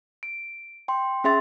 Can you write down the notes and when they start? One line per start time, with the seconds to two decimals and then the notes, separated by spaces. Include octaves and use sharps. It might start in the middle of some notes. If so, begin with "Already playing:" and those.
0.23 D7
0.88 G5 C6
1.24 C#4 G#4 E5 C6 A6